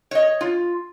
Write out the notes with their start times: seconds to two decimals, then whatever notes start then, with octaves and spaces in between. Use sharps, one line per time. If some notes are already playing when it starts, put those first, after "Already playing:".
0.11 C#5 D#5
0.41 F4